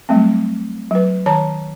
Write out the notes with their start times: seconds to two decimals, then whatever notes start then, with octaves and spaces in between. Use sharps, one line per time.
0.09 F#3 G3 A3 C4
0.91 F#3 B4
1.26 D#3 C#5 A5 A#5